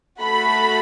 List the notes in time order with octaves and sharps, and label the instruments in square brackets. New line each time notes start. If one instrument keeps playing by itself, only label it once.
[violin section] A3 F#4 A4 B5